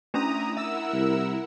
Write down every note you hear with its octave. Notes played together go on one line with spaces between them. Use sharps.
A3 C#4 D4 E4 A#5 D#6
E4 A#4 E5 F#5 E6
C2